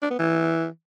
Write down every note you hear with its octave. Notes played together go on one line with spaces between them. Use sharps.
D4
B3
E3